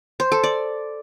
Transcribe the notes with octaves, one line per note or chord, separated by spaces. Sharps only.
C5
A4
D5